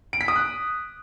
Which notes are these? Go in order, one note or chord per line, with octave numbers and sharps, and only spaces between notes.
D7
B6
D#6
F#6